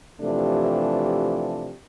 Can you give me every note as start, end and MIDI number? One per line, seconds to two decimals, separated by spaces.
0.21 1.74 48
0.21 1.74 52
0.21 1.74 53
0.21 1.74 57
0.21 1.74 62
0.21 1.74 67